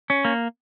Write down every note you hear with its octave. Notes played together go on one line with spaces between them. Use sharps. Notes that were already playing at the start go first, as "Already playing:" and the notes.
C#4
A#3